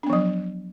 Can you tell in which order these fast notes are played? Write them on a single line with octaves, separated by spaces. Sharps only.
D4 B3 F3 F#3